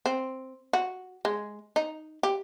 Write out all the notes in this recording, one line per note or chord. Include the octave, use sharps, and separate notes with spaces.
C4
F#4
G#3
D#4
G4